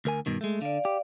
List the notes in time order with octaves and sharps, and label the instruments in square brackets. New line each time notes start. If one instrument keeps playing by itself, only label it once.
[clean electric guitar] D2 A#4 G#5
G2 B2 D#3
G#3 A3
[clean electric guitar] D3 [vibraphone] D5 F5
[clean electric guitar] G4